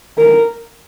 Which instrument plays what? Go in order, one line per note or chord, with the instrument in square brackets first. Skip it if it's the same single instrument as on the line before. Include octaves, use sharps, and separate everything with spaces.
[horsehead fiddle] A#4